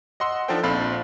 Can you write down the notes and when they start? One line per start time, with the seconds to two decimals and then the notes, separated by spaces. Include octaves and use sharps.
0.20 D#5 F#5 C6 E6
0.48 F3 D4 D#4 A4 C5 G5
0.63 A#1 C4 F4 F5 B5 A6